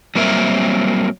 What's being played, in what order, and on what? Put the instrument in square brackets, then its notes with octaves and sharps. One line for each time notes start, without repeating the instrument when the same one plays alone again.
[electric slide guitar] F#3 G3 A#3 C4 A#4 E5